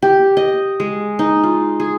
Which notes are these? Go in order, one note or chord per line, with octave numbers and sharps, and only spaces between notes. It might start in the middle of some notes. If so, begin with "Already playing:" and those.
G4
D#5
G#3
D#4
F4
G#4